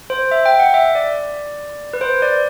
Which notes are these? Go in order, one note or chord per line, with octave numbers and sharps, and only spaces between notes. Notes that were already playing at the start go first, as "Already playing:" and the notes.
C5
E5
G5
F#5
E5
D5
B4
C5
D5